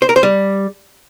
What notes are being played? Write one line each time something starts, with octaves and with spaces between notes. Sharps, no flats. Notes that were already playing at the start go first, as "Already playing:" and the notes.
C5
A#4
C5
G3